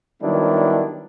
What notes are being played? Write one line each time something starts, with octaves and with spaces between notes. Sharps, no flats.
D#3 F#3 G3 B3 D4 E4